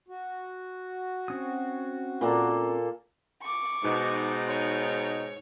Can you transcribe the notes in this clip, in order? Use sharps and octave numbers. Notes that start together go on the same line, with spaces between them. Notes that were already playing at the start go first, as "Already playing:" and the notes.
F#4
C4 C#4 D#6
A#2 A#3 A4
C#6 D6
G#2 B2 D#4
C#5